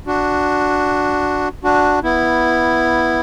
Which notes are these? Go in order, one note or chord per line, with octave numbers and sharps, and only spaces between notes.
D4 F#4
D4 F#4
B3 E4